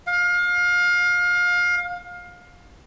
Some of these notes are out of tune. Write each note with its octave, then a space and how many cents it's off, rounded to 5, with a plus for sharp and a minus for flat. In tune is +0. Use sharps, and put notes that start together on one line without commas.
F5 +30